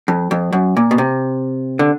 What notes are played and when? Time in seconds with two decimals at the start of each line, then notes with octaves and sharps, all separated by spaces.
0.08 F2
0.31 F2
0.53 F#2
0.77 A#2
0.91 B2
0.98 C3
1.79 D3